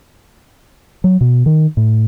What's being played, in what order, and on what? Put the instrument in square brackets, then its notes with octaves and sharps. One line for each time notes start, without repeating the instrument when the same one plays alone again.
[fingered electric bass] F#3
B2
D#3
A2